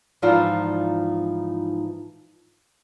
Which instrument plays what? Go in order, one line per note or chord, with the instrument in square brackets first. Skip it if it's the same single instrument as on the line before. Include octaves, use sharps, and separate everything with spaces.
[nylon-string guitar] G#2 E3 F3 D#4 F4 D5